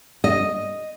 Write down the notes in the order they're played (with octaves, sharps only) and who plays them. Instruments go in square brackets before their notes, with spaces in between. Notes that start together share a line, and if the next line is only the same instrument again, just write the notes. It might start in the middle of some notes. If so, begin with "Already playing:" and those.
[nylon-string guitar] D#5